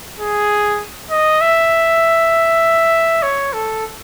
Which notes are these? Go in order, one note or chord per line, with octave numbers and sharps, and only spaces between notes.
G#4
D#5
E5
C#5
A4